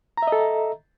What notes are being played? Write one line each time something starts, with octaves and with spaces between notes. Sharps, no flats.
A4 D#5 E5 A#5